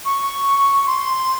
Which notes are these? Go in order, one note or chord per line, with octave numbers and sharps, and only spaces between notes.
C#6
C6